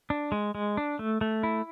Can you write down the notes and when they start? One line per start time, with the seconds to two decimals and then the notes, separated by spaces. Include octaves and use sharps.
0.10 D4
0.32 G#3
0.55 G#3
0.77 D4
0.99 A3
1.21 A3
1.43 E4